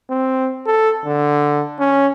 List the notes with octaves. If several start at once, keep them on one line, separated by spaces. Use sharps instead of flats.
C4
A4
D3
C#4